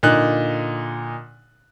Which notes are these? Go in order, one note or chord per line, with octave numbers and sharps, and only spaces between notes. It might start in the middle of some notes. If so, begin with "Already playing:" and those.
A#2 D3 D#4 F#6